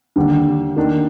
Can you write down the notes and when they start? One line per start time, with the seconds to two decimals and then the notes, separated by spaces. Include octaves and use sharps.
0.16 D#2 D3 G3
0.76 D#3 A#3 D4